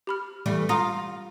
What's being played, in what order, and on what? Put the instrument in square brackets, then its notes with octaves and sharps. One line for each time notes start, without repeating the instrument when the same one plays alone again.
[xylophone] G4 B5 F6
[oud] E3 G3 A3
[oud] F4 [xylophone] A#5 D#6 A#6